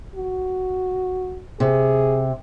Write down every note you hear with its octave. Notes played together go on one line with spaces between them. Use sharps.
F#4
C3 G#4